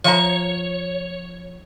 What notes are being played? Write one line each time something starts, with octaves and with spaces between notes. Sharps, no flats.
F3 C#5 E5 A#5